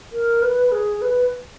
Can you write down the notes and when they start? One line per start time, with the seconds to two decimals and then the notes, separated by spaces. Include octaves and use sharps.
0.12 A#4
0.42 B4
0.72 G#4
1.02 B4